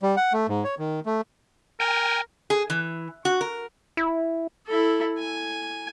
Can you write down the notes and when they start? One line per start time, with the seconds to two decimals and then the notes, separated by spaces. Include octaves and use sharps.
0.02 G3
0.17 F#5
0.33 A3
0.49 G#2
0.64 C#5
0.79 D#3
1.06 A3
1.80 A#4 G5 G#5
2.50 G#4
2.70 E3
3.25 F#4
3.41 A#4
3.97 E4
4.67 E4 A4
5.19 G#5